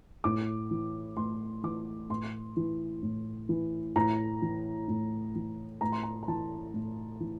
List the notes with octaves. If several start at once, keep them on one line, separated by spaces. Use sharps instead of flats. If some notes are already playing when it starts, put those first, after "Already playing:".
A2 D6
E3
A2 C6
E3 D6
A2 C6
E3
A2
E3
A2 A#5
E3
A2
E3
A2 A#5
C6
A#5
A#5
E3 A5
A2
E3